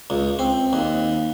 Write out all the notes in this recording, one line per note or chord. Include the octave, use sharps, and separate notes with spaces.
C#2
C4
D#2